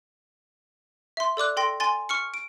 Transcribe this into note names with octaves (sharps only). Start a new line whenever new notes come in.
E5 C6
A4 D5 D6 F#6
A4 G5 C6 A#6
G#5 C6 A6
C#6 F6 C#7
D7